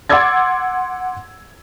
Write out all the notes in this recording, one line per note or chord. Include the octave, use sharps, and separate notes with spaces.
F#5 C6 D6 E6 G#6 A6